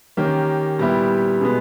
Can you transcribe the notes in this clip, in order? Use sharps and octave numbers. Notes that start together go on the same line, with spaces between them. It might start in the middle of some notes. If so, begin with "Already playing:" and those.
D#3 A#3 C#4 G4
A#2 G3 B3 E4 G4
B2 G#3 B3